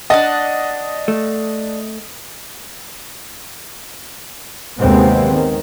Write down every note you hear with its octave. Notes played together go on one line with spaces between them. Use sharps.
D4 D#5 F#5 A5
A3
D#2 C3 G#3 B3 C4
D#3